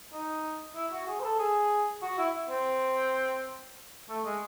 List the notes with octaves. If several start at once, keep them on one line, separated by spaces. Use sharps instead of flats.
D#4
E4
F#4
G#4
C5
A4
G#4
F#4
E4
C4
A3
G#3